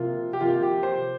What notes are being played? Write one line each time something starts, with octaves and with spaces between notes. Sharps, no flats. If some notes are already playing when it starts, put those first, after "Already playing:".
Already playing: C3 F3 A#3 F4
G4
C3 F3 A#3 F4
G4
C5